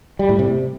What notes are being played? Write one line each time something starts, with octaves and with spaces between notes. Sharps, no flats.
G3
A2
C3